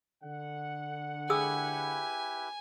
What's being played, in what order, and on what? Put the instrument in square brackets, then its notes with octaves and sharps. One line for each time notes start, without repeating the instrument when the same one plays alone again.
[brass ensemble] D3 F#5
[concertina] E4 G4 B4 [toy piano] G#4 D#6 E6 [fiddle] G#5